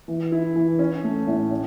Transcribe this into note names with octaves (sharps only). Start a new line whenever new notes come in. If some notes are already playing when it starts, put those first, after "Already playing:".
E3
E4
E3
C#4
A3
A2
C#4